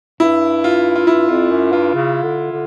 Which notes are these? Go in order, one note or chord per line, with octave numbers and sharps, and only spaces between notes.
G2 E4
F4
F4
G2 E4
F2 F4
F#2
G2 F4
C#3
D3
D3